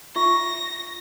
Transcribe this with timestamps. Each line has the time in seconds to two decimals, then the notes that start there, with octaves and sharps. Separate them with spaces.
0.16 F4 E5 C#6 A#6